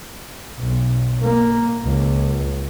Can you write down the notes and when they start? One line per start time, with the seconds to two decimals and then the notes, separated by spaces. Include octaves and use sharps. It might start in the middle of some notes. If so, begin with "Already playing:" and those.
0.59 B1
1.21 A#3
1.85 C#2